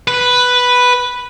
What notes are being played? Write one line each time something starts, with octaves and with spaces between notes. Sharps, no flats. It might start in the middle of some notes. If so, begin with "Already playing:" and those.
B4